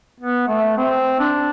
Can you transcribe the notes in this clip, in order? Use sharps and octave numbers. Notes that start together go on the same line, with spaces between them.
B3
A3
C4
D4